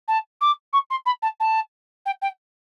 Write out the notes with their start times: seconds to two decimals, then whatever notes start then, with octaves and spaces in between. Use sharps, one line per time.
0.08 A5
0.41 D6
0.73 C#6
0.90 C6
1.06 B5
1.22 A5
1.40 A5
2.06 G5
2.22 G5